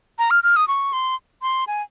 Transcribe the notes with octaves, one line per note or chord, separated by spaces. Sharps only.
A#5
F6
F6
D#6
C#6
C6
C6
G#5